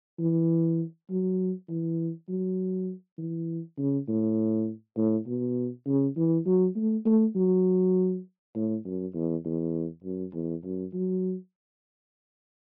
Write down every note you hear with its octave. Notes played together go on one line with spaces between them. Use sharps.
E3
F#3
E3
F#3
E3
C#3
A2
A2
B2
C#3
E3
F#3
A3
A3
F#3
A2
F#2
E2
E2
F#2
E2
F#2
F#3